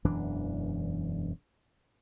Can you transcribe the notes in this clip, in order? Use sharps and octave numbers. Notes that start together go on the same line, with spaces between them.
E1 F#2 E3 D4